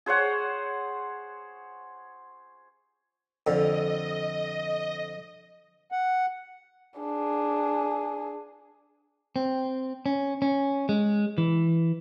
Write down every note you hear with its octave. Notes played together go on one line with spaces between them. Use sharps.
G#4 C5 C#5 F#5
F2 D3 D#5
F#5
D4 G#4
C4
C#4
C#4
G#3
E3